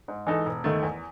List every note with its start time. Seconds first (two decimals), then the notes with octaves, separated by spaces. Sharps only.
0.08 G#2
0.27 E3 G#3 D#4 A4
0.46 E1
0.64 D#2 D#3 A3
0.83 E2